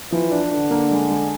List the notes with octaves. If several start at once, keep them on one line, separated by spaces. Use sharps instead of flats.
E3 F3
D4
D3 D4
A#3
G#3
G#3